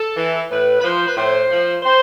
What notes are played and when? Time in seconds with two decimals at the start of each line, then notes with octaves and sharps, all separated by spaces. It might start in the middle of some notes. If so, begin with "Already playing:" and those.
Already playing: A4
0.17 E3
0.51 A2 B4
0.80 B4
0.84 F3 C5
1.07 B4
1.17 A2 C5
1.50 F3
1.83 C5